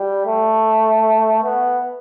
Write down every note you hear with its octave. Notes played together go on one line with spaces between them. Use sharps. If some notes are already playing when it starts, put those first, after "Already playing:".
Already playing: G3
A3
B3